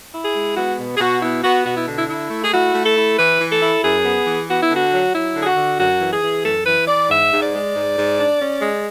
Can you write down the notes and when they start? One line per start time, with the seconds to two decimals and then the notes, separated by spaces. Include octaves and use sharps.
0.13 E4
0.23 G#4
0.35 G#3
0.56 B3 F#4
0.78 B2
0.96 G#4
1.00 B2 F#4
1.21 B3 E4
1.43 B3 F#4
1.65 B2 F#4
1.75 E4
1.86 D3
1.97 E4
2.08 E4
2.30 A3
2.44 G#4
2.52 E4 F#4
2.73 A3
2.85 A4
2.95 E4
3.17 E3 B4
3.39 E3
3.50 A4
3.61 E4
3.83 F#2 G#4
4.04 B3
4.26 E3
4.48 B3 F#4
4.62 E4
4.70 D3
4.76 F#4
4.91 F#3
5.13 F#3 E4
5.36 D3
5.41 G#4
5.46 F#4
5.56 D3
5.78 F#2 F#4
6.00 E3
6.11 G#4
6.22 E3
6.44 F#2 A4
6.66 E3 B4
6.87 E3 D5
7.09 G#2 E5
7.32 G#2
7.42 D5
7.53 G#3
7.74 G#2
7.97 G#2
8.18 D4
8.40 C#4
8.61 G#3